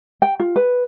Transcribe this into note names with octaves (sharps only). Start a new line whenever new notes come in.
G5
F4
B4